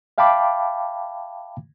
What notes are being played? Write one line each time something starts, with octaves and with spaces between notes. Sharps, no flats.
E5 F5 G5 A5 B5 D6